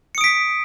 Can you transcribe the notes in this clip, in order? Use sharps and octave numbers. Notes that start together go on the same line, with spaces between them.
D#6 B6 C#7 D7